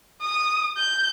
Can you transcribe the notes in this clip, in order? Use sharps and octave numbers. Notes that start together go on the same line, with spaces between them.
D#6
G6